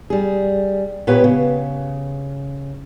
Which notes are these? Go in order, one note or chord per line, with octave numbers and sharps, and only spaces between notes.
G3 G#4
A#2 B3 G4 B4 C#5 G5
C#3